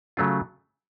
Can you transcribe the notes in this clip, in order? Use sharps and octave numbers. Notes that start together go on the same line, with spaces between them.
C#3 F#3 A3 C#4 F4